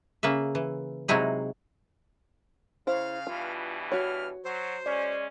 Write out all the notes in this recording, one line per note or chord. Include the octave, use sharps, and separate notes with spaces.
C#3 A#3 B4 E5
E3
C3 F#3 G#3 D#4 E4 G#4
C#3 E4 C5 F5
G2 B2 E3 F4
F#4 C#5 F6
F#3 C5
G#3 C#4 D5